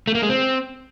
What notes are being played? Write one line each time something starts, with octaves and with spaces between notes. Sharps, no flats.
A3
A#3
G#3
C4